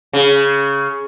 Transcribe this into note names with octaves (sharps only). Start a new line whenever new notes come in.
C#3